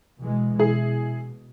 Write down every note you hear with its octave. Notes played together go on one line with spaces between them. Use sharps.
B2 E3 G#3
B2 E4 G#4